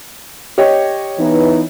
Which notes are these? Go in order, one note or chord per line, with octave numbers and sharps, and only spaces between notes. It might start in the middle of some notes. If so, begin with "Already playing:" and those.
G4 C#5 D#5
E3 B3 D#4